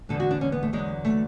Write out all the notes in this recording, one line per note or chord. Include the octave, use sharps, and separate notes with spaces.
E2 D3 G#3 A4
F#4
D4
C#4
B3
A3
E2 D3 F#3 G#3
A3